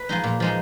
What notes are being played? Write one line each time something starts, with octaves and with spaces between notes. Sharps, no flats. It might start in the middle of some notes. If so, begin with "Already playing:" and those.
Already playing: B4
F3 G#3 D#4
A#2
F3 G#3 D#4